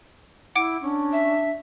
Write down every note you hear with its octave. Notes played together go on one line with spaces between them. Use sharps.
E4 F#5 D6 D7
C#4 D4
E5